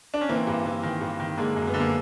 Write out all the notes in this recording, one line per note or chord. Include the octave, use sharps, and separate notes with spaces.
D4
C#4
E3 A#3 C4
G2
E3
D#3
G2
D#3
D3 G#3 A#3
F#2
B3
D3
A#3